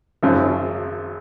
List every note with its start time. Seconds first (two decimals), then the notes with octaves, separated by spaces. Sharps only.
0.23 G#1 F#2 C#3 F3